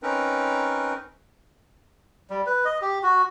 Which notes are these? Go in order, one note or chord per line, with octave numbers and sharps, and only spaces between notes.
C4 C#4 D#4 A#4 B4
G3
B4
D#5
G4
F#4